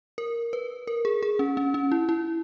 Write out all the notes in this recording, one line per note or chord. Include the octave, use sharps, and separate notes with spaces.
A#4
B4
A#4
G#4
G#4
C#4
C#4
C#4
E4
E4